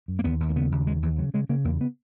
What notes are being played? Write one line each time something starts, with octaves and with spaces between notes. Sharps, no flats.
F#2
A#3
D#2 B3
D#2
A#3
C#3 B3
D#2
C#3 G#3
D#2 E3
C#3 F#3
C#3 G#3
C#3 A#3
E2 A#3
B3